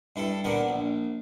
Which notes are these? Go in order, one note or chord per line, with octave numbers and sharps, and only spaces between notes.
G2 E4 A4
A#2 D3 B3 A#4
A#1